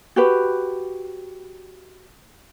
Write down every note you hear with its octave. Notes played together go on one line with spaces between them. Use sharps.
F#4 G4 B4